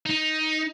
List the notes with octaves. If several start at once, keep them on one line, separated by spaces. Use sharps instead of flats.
D#4